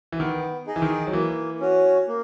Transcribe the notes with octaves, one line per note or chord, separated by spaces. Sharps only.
E3
D#3 B3
D#4 G#4 D#5
E3
D#3
F#3
E3 A#3
C#4 F#4 C#5
A#3